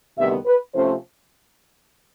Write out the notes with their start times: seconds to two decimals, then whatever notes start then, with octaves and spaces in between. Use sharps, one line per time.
0.17 D2 C3 D#3 G3 B3 E5
0.46 B4
0.74 C3 F3 A3 C#4 C5